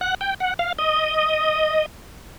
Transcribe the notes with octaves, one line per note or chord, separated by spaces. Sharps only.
F#5
G5
F#5
F5
D#5